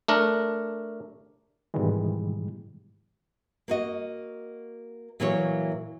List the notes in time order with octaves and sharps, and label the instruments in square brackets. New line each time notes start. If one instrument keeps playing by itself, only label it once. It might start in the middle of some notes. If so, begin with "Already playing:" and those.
[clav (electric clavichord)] A3 D4 A#4
[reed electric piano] G#2 B2 D#3 E3 G3 G#3
[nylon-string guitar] A#3 F#4 D#5
A#2 E3 F#3 A#3 E4 C#5